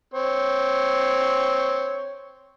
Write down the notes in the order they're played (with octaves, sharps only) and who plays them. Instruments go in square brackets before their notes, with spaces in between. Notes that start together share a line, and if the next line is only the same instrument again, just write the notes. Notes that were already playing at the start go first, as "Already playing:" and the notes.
[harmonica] C4 C#5